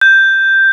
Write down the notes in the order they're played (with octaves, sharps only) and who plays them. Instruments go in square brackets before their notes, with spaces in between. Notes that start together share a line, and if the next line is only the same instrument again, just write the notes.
[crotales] G6